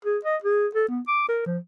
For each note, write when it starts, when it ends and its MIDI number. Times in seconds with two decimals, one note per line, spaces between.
0.05 0.18 68
0.25 0.37 75
0.44 0.67 68
0.75 0.86 69
0.89 1.01 59
1.08 1.27 86
1.29 1.41 70
1.46 1.58 53